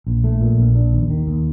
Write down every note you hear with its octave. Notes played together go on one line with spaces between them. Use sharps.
A#1
A3
A#2
A#1
D4
D#2
D#3
D#2